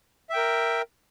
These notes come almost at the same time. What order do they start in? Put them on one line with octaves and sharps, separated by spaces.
E5 G5 A#4